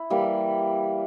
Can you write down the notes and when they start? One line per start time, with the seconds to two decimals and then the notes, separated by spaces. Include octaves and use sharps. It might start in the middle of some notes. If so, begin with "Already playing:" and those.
Already playing: E4
0.10 E3 G3 A#3